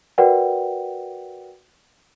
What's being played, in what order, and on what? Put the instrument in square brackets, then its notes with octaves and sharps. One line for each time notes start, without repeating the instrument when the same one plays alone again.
[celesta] F#4 A#4 B4 D5 F#5 G5